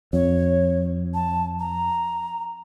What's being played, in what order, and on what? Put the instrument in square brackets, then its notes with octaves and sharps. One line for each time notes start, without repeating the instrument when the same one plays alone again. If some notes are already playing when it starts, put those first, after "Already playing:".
[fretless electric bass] F2 [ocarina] C#5
[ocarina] A5
A#5